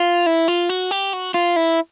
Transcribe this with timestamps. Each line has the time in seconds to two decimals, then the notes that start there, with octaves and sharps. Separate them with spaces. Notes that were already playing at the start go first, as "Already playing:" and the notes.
Already playing: F4
0.26 E4
0.48 F4
0.69 F#4
0.91 G4
1.13 F#4
1.34 F4
1.56 E4